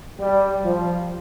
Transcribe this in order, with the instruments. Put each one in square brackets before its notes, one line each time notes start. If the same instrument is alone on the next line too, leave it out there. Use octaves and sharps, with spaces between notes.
[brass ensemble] G3
F3